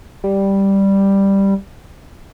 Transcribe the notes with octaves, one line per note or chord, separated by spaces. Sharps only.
G3